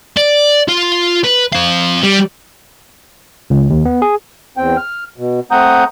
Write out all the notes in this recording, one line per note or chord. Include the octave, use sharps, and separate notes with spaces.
D5
F4
B4
C4 F5
G3
C#2
D#2
B3
G#4
E2 C4 G5
F6
B2
A3 C4 F#5 A#5 D#6 G6